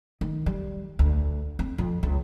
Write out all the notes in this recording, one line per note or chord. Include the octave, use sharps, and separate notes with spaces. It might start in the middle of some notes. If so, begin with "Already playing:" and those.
D#3
G3
D2
C4
F2
C#2